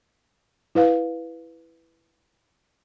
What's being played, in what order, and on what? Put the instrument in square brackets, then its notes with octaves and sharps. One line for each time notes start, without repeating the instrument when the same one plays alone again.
[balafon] E4 B4 F5